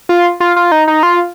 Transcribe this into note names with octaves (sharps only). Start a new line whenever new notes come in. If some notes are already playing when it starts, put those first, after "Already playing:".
F4
F4
F4
D#4
D#4
F4